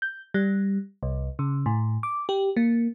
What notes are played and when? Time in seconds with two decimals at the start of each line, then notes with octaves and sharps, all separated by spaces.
0.02 G6
0.34 G3
1.03 C2
1.39 C#3
1.66 A2
2.03 D6
2.29 G4
2.56 A#3